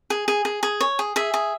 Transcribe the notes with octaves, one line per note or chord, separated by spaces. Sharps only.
G#4
G#4
G#4
G#4
C#5
G#4
G#4 E5
G#4